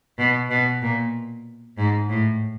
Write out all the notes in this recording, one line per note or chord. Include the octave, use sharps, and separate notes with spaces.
B2
B2
A#2
G#2
A2